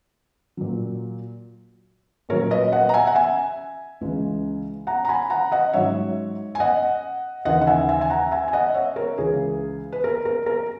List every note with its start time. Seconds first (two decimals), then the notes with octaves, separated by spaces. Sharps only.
0.57 A#2 F#3
2.29 A#2 F#3 A#4 C#5
2.51 B4 D#5
2.72 D#5 F#5
2.89 A#5
2.94 E5 G#5
3.07 F#5
3.15 E5 G#5
4.01 C#2 C#3 E3 G#3
4.87 F#5 A#5
5.05 A#5
5.09 G#5 B5
5.30 F#5 A#5
5.52 D#5 F#5
5.73 G#2 F#3 C#5 E5
6.55 G#5
6.60 D#5 F#5
7.45 D#2 C#3 E3 D#5 F#5
7.61 F#5
7.67 E5 G#5
7.89 E5 G#5
8.01 G#5
8.10 F#5 A#5
8.31 E5 G#5
8.48 G#5
8.53 D#5 F#5
8.74 C#5 E5
8.96 A#4 C#5
9.18 C#2 C#3 E3 G#4
9.92 B4
10.04 A#4
10.25 A#4
10.46 A#4